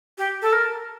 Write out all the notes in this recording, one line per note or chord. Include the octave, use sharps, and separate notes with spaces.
G4
A4
A#4